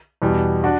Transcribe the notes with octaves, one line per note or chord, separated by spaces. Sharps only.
E2 B2 G3
D4 F#4